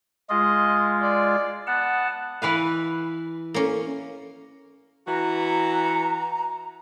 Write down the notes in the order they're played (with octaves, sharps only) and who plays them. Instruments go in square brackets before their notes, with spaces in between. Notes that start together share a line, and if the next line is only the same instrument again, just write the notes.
[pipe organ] G#3 F4 [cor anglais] D#5
[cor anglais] D5
[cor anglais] B3 [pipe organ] F#5 A5
[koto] E3 B4 F5
[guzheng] A#3 C#4
[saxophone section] E3 F#4 [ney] A#5